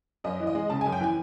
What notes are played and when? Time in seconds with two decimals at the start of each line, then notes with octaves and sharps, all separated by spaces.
0.24 F#2 D#5
0.40 E3
0.47 D#5
0.55 G#3
0.70 C#3 A5
0.81 F#2 G#5
0.92 G5
1.00 E3 G#5